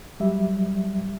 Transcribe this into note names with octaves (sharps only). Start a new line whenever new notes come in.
F#3 G3 E5